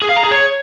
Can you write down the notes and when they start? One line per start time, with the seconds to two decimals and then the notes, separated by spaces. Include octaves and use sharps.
0.02 G#4
0.09 F5
0.16 A#5
0.24 G#4
0.31 C#5